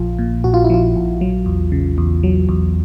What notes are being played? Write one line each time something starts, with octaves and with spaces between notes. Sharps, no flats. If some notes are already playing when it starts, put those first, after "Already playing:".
Already playing: A#1 F3 F4
A#2
A#1 F#4
F4
E4
F3 F4
A#1
F#3
E2
C#3
E2
F#3
E2